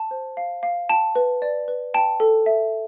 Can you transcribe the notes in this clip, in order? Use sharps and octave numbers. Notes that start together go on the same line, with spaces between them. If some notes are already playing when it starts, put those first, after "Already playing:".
Already playing: A5
C5
F5
F5
G5 A5
B4
D5
B4
G5 A5
A4
E5